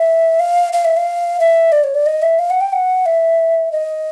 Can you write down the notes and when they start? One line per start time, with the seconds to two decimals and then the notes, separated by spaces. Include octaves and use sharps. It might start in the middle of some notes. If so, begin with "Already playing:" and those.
Already playing: E5
0.40 F5
0.73 F5
0.85 E5
0.97 F5
1.40 E5
1.72 D5
1.84 C#5
1.94 D5
2.06 D#5
2.22 E5
2.39 F5
2.50 F#5
2.61 G5
2.73 F#5
3.06 E5
3.72 D#5